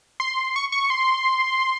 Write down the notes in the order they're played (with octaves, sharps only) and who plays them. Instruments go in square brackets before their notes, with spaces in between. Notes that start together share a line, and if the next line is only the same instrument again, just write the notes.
[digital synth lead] C6
C#6
C#6
C6